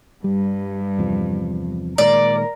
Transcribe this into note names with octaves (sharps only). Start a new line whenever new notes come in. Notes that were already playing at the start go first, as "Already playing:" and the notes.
G2 G3
E2 C3 F3
A#2 D#3 G#3 A#4 D5